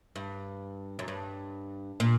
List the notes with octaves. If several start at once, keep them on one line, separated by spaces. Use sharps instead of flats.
G2
F#2
G2
A#2